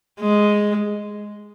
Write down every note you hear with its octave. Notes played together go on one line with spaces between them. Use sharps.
G#3